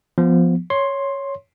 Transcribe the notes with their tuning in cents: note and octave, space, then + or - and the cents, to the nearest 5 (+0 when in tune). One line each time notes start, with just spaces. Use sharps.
F3 +0 B3 +0
C#5 +0 C6 +10